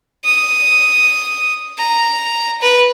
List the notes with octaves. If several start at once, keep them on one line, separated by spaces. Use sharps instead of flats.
D#6
A#5
B4